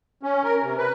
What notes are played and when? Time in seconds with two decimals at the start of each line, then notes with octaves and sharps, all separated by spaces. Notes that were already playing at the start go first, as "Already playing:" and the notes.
0.23 C#4
0.44 A#4
0.63 C3
0.77 B4